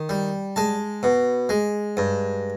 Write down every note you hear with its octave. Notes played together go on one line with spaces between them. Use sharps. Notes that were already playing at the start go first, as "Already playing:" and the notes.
Already playing: D#3
G3
G#3 A5
B2
G#3
G2